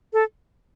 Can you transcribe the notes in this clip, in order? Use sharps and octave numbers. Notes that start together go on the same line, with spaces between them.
A4